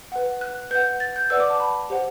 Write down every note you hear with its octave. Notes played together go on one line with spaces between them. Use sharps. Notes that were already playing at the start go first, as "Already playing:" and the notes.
B4 F#5
F#6
B4 F#5 G6
A6
G6
B4 D5 F#5 E6
D6
A5
B5
G4 C5 F#5